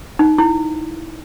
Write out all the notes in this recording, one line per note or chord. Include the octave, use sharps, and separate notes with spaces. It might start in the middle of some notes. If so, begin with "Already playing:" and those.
D#4
E4